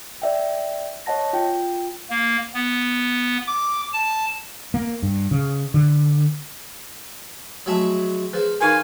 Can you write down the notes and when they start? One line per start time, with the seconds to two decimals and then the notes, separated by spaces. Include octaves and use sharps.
0.22 D5 E5 G5
1.06 C#5 D#5 F#5 A5 A#6
1.33 F4 G5
2.10 A#3
2.54 B3
3.47 D6
3.93 A5
4.74 A#3
5.02 G2
5.31 C#3
5.74 D3
7.66 F3 F#3 G#3 A3 E5 A5
8.33 F3 G#4 B4 C5
8.60 E3 D#4 F4 A#4 B4 F5 G#5